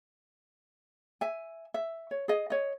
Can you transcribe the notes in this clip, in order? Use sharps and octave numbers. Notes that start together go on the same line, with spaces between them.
E5 G#5
E5
C#5
G#4 D#5
C#5 D#5